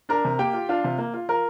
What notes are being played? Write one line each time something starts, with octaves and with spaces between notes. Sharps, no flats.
D4 A#4 A#5
C3
A#3 G4 G5
F4
D4 F4 F5
C3
A#3
F4
F4 A#4 A#5